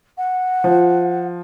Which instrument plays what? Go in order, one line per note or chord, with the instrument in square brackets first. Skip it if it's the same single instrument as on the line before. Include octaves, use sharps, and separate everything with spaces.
[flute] F#5
[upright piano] F3